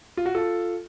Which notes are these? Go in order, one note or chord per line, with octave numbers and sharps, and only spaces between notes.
F4
F#4
F4 A4